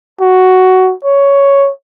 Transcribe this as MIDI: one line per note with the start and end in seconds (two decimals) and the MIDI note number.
0.21 0.93 66
1.04 1.70 73